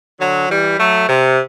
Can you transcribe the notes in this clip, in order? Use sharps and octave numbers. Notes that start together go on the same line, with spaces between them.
D3 F#3
E3 G3
F#3 A3
C3